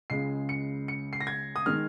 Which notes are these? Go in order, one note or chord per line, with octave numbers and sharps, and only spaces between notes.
C#2 C#3 G#3 C7
C#7
C#7
C7
A#6
G#6
D#6
D#3 G#3 F6